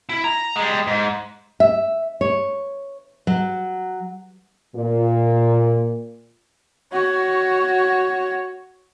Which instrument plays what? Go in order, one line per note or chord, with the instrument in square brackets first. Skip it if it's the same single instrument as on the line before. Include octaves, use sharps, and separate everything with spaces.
[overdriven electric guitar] E4
A#5
G3 G#3
G#2
[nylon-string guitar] E5
C#5
F#3
[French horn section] A#2
[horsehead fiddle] F#4 C#5